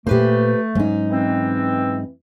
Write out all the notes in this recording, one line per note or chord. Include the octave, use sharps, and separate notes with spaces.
A#2 A3 A#3 G4 B4 C5
G#2 F#3 G#3 C#4 D#4
E3 C4